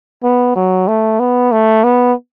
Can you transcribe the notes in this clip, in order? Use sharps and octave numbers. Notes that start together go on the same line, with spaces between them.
B3
F#3
A3
B3
A3
B3